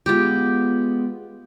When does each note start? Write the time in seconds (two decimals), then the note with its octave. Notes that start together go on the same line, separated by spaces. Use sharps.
0.06 G#3 B3 F4 G4